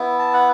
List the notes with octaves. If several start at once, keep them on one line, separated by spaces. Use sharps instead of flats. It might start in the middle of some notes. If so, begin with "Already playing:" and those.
Already playing: B3 E4
A5
F#5